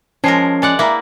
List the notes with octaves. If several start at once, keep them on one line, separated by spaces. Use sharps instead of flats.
F3 G#3 C#4 A#4 A5 G#6 C7
G#3 D5 F#5
A#3 E4 E5 A#5